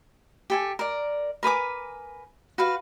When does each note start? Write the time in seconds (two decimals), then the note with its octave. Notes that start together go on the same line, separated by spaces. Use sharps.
0.50 G4 A4 G#5
0.79 A#4 D5
1.43 A#4 B4 G#5 D6
2.58 F#4 B4 F5